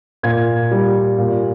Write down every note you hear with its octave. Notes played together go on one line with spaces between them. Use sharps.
A#2 G#6
G3
A#2